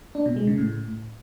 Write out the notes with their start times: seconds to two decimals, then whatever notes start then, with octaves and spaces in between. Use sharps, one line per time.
0.15 D4
0.26 B2
0.36 G#3
0.47 C#3
0.58 A2